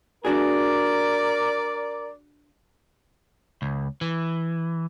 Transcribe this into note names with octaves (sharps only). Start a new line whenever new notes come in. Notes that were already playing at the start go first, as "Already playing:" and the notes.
D4 F#4 G#4 A#4 D5
C#2
E3